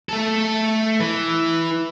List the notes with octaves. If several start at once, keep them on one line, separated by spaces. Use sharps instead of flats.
A3 A4
E3